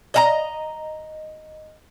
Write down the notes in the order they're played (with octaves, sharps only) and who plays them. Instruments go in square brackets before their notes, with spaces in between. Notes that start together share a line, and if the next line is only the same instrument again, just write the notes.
[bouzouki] D#5 E5 A#5